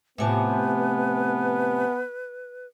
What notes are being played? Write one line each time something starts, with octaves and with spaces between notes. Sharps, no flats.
A2 C3 F3 B3 B4 E5 G#5 A5